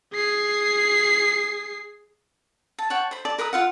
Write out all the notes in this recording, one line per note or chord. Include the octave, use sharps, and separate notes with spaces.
G#4 C7
A5
C#5 F#5 G5 A5
C5 B5
D5 A5 D6
A#4 B4 B5 D#6
F4 F5 F#5